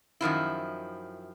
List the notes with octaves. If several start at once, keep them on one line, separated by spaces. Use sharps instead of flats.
F#2 D#3 F3 E4